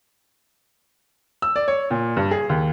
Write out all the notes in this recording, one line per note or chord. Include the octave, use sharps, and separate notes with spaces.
E6
D5
C#5
A#2
G2
G#4
D#2